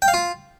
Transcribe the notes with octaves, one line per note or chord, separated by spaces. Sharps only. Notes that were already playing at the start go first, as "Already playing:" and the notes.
G5
F5
F4